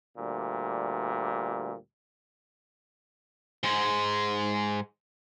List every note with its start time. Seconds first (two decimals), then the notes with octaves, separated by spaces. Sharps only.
0.18 D2 A#2 G3
3.63 G#2 G#3